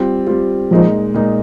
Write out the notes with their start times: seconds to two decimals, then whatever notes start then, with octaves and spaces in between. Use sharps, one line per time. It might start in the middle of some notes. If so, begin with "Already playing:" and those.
Already playing: G3 C4 F4
0.27 G3 C4 F4
0.70 A#2 F3 G#3 D#4
1.14 A#2 G#3 D#4